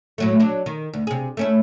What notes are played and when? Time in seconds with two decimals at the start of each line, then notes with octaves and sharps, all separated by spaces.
0.18 A2 F#3 A3
0.40 F#3 D4
0.66 D#3
0.94 D2
1.07 C3 G#4
1.37 A3 C#4 E4